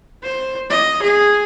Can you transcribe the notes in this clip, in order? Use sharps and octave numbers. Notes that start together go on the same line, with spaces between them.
C5
D#5
G#4